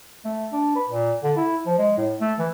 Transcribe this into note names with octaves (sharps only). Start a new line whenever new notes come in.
A3
D4
B4
A#2
D3
E4
F3
G#3
A2
A3
E3